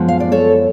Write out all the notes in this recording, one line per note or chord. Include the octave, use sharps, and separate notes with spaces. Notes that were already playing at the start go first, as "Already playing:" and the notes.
Already playing: F#2 F3 G#3 B3
F5
D5
A4 C#5